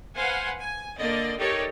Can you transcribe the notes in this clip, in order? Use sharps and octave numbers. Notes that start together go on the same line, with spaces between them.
B4 C5 F5 F#5 G#5
G#5
D3 A#3 D5 D#5
D#4 G4 A4 A#4 C#5 D5